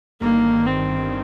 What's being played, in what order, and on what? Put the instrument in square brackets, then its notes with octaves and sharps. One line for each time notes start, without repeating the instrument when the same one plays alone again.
[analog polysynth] G1 G2 D#3 [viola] A#3
[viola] C4